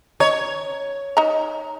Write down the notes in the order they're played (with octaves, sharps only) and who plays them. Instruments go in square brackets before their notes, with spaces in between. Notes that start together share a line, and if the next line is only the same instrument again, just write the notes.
[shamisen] D#4 [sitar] C#5
[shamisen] D#4 A#5